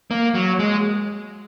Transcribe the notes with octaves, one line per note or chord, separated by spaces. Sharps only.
A#3
F#3
G#3